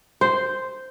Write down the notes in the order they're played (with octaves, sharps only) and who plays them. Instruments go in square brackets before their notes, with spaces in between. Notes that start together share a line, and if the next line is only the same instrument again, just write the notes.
[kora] C5